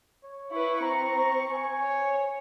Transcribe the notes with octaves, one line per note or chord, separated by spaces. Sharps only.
C#5
E4 B4 C#6
C4 A#5 C#6
G#5
C#5